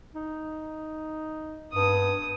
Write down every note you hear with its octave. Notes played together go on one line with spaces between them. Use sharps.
D#4
G2 D#6